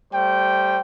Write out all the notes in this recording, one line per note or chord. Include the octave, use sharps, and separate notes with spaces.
G3 A3 C5 G5